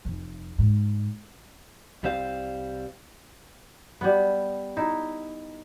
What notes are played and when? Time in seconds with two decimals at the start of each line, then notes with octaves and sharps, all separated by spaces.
0.05 F1
0.58 G#2
2.03 C2 G3 C4 C5 F5
4.01 G3 B3
4.77 D#4 E4